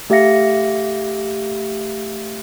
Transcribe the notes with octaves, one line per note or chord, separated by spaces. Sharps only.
A3 G4 E5 F5 A#6 C#7